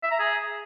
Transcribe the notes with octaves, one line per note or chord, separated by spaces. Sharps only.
E5
A#5
G#4